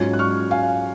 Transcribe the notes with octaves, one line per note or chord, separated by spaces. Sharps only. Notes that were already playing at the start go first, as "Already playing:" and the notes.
Already playing: G#2 F#3 C#4 F4 G#6
F#6
C#6 F6
F5 G#5